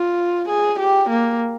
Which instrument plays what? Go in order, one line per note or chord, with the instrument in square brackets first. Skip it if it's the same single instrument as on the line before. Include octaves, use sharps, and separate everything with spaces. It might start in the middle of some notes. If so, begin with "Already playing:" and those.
Already playing: [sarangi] F4
G#4
G4
A#3